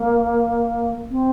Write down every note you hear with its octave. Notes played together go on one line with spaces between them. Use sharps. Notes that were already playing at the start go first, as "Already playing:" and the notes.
Already playing: A#3
C4